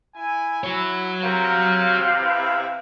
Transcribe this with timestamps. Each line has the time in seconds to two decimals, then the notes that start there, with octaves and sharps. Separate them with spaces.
0.14 E4 G#5
0.64 E4 F#4 C#5
1.23 C3 A#4 F5
2.18 E4 B4